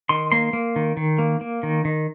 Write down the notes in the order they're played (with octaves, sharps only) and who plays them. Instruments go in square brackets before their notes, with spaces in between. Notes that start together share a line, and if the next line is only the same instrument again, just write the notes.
[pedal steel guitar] D#3 C6
A#3 C6
A#3
D#3
D#3
A#3
A#3
D#3
D#3